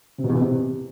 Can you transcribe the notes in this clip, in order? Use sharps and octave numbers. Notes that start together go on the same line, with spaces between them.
C3
B2
E2
B2
C3